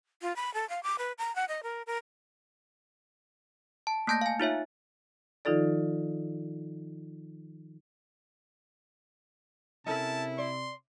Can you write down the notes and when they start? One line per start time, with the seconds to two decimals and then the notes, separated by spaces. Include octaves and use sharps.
0.22 F4
0.36 B5
0.54 A4
0.69 F5
0.83 D6
0.99 B4
1.18 A#5
1.36 F#5
1.48 D#5
1.63 A#4
1.87 A#4
3.87 A5
4.07 A3 A#3 A5 G6 A#6
4.21 F5 G#5
4.40 D#4 F4 C#5 E5
5.45 D#3 F3 D#4 F4 A4 D5
9.87 C3 C#4 E4 A4 A#4 A5
10.38 D5 C6